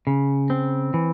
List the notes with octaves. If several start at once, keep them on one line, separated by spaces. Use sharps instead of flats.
C#3
C4
E3